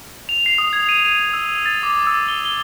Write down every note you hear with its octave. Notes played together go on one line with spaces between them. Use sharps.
F7
C7
D#6
G#6
D#7
D#7
E6
A6
D6
E6
G7
G7